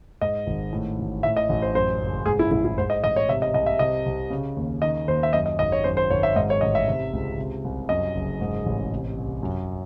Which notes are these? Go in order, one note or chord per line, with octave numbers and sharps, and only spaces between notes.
G#2 D#5
G#1
A2
A1
A2 E5
D#5
A1
C5
F#2 C5
F#1
G#2 G#4
E4
A1 E4
E4
G#2 C5
D#5
A1 D#5
C#5
C3 E5
D#5
C2 D#5
E5
C3 D#5
C2
C#3
D#2
D#3 D#5
D#2 C5
E5
F#2 D#5
D#5
G#1 D#5
C#5
F#2 C5
C5
G#1 C#5
E5
G#2 D#5
C#5
A1 D#5
E5
C3
C#2
C3
C2
F#2 D#5
F#1
G#2
A1
C3
C2
F#2